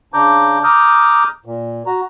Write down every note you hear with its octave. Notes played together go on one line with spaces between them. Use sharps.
C#3 D4 A#5 D6 G6
A#5 D6 D#6 F6 G6
A#2
F#4 A#5